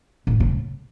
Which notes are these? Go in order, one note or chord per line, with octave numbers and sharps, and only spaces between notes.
A2
C#3